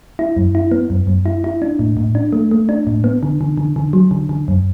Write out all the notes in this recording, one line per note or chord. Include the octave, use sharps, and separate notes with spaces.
E4
F#2
E4
B3
F#2
F#2
E4
E4
D4
A2
A2
D4
A3
A3
D4
A2
B3
D3
D3
D3
D3
F#3
D3
D3
F#2